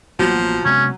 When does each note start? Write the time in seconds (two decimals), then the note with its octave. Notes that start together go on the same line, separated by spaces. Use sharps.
0.19 A1 F3 F#3 A#3 B3
0.65 C3 G#3 B3 C#4